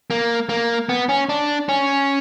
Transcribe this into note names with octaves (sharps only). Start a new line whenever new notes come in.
A#3
A#3
B3
C#4
D4
C#4